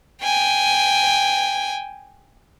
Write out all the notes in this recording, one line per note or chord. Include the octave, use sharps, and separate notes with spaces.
G5 G#5